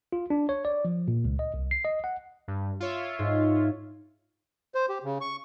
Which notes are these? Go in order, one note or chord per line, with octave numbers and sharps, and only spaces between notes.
F4
D4
C#5
D5
F3
A#2
C#2
D#5
C2
C7
D#5
F#5
G2
F4 C#5 E5
G#2
C5
G4
C#3
C#6